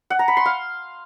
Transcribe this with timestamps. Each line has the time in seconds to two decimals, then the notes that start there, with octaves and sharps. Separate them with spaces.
0.10 F#5
0.19 A#5
0.28 B5
0.37 C6
0.46 F5